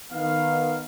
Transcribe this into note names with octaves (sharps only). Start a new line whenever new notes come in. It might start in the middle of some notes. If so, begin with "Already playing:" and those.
D#3 B3 F5